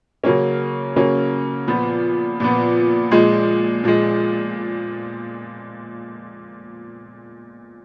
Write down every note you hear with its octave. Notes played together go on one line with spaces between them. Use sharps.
C#3 F#3 A#3 C#4
C#3 F#3 A#3 C#4
A#2 F3 B3
A#2 F3 B3
A#2 F3 G#3
A#2 F3 G#3